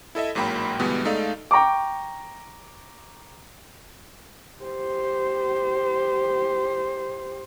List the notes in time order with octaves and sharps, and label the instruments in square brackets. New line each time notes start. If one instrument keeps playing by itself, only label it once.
[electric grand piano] E4 A4 D#5 E5
A1 G#2 F#3 A#3 G5 B5
D2 B2 E3 G3 G#3 B3
G#3 A3 D#4 A4 D5 F5
[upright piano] G5 A#5 C#6 D6
[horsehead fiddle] G4 C5